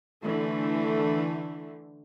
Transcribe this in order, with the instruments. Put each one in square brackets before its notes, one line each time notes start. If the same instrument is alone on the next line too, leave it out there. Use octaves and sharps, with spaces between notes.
[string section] D3 E3 A3